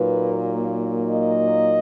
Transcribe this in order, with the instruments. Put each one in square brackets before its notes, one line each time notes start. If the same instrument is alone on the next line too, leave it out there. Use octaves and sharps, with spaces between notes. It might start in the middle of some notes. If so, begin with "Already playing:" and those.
Already playing: [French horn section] A#2 F#3 A#3 D#4 B4
D#5